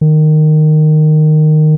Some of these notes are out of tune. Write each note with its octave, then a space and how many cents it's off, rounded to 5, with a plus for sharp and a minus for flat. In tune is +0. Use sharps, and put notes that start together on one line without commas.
D#3 -15